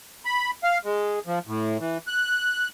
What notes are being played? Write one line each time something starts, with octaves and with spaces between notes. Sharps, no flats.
B5
F5
G#3
F3
A2
E3
F#6